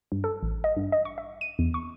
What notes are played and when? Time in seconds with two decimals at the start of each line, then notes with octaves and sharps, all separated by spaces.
0.12 G2
0.24 A4
0.43 A1
0.64 D#5
0.77 G2
0.92 D#5
1.05 C#6
1.18 E5
1.41 D#7
1.59 E2
1.74 C#6